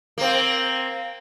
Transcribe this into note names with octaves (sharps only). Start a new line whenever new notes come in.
A#3 C4